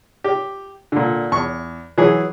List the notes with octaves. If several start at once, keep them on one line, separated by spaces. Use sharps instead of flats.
G4
A#2 D3
E2 C#6
E3 F#3 G#4